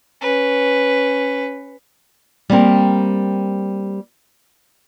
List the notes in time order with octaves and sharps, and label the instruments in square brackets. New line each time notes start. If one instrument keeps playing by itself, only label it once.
[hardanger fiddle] C#4 B4
[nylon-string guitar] G3 A#3 C4 A#4